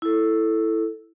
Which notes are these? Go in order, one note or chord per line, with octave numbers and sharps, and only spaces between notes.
E4 A4